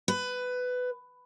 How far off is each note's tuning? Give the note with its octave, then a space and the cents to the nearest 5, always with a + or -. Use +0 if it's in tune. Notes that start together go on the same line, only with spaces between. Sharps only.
B4 +15